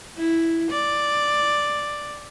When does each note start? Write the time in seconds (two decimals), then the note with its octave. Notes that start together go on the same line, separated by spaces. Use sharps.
0.17 E4
0.71 D5